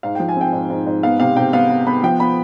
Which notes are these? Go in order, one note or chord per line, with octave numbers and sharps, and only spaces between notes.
G#2 F5
G5
F3
G#5
C4 G5
G#2
G#2
G#2
B3 F5
C3 F5
C3 G5
B3 F5
B3
B3 B5
F3 G5
B3 B5